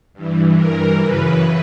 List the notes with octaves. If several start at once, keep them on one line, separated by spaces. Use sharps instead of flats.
G2 E3
A#4
F#2 C#3 E3 B4